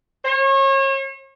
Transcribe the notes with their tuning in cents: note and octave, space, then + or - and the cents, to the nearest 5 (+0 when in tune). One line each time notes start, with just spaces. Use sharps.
C#5 -35